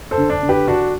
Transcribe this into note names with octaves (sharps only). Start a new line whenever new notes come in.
A4 C5
D3
D4
D3
G4 B4
D3 D4 F#4